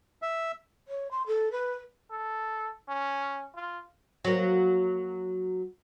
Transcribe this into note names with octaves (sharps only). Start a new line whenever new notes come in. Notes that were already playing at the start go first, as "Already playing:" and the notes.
E5
C#5
C6
A4
B4
A4
C#4
F4
F#3 A#3